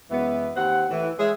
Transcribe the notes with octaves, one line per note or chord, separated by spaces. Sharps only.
F#2 E3 G#3 B3
D#2 C4 F#5
A2 E3
G#3 G#4 C#5 E5